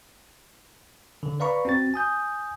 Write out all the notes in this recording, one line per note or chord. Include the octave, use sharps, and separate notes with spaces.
D3
B4 D5 F5 A#5 B5 C#6
C4 F#4 A6
G#5 D#6 G6